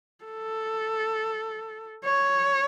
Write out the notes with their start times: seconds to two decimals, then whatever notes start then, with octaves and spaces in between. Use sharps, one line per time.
0.25 A4
2.04 C#5